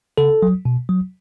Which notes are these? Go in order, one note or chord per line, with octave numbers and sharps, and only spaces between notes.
C#3 A4
F#3
B2
F#3